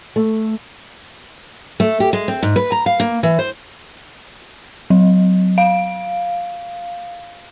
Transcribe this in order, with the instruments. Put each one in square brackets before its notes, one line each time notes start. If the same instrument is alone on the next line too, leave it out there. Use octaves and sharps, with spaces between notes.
[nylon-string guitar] A3
[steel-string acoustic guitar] A3
G4
G#3
C4
G#2
B4
A#5
F5
A#3
E3
C5
[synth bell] F#3
F5